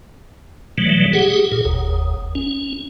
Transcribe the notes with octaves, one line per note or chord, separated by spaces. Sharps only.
B2 E3 F#3 G3 A3
G4 G#4 F#5
A#2 G#4
F#1 D#2
C#4